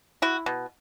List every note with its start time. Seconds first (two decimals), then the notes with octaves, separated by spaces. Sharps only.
0.22 E4 F#4
0.46 B2